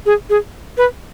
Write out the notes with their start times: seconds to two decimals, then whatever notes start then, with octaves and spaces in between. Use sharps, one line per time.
0.06 G#4
0.30 G#4
0.78 B4